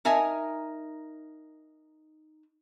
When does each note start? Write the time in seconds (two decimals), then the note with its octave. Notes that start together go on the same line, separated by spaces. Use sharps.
0.05 D#4 A#4 E5 G#5